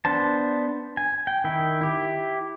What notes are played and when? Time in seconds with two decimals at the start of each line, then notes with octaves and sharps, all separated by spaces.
0.05 B3 D4 C5 A5
0.97 G#5
1.27 G5
1.44 D#3 E4 G5
1.81 E4 G4